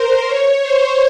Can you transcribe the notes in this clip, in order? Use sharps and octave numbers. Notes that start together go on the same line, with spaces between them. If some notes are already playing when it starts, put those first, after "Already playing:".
Already playing: A#4 C5
C#5
C5